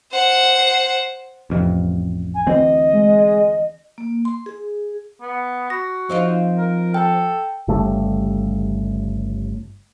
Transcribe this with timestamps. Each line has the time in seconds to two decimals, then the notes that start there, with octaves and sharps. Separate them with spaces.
0.12 C5 F#5
1.50 A1 F2 C3
2.34 G#5
2.47 D2 E3 C4 D#5
2.93 G#3
3.98 A#3
4.25 C6
4.46 G#4
5.22 B3
5.70 F#4 A#6
6.09 F3 C4 D#4 F4
6.57 A#4
6.94 A4 G5
7.68 G1 C#3 G3 A3